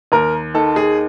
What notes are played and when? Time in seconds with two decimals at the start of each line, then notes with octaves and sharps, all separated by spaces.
0.12 D#2 A#4
0.54 D#3 A4
0.76 G#4